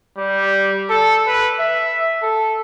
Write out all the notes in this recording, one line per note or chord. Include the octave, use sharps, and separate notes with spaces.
G3
A4
B4
E5
A4